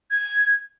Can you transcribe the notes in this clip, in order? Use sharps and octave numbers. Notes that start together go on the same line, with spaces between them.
G#6